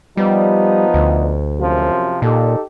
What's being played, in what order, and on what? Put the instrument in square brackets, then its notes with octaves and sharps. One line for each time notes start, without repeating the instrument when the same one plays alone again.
[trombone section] F3 B3 D#4 [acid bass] G3
[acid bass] D2
[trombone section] F#2 C3 F3
[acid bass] A#2 [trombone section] D#4 G4 A4